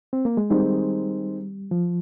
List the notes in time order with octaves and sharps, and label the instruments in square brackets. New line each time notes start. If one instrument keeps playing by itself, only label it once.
[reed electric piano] C4
A#3
G#3
[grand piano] D#3 G#3 C4 D#4 [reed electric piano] G3
[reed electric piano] F3